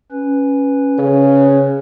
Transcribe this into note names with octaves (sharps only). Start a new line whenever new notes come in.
C#4 B4
C#3